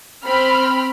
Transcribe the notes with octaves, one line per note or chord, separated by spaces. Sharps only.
C4 B5 F6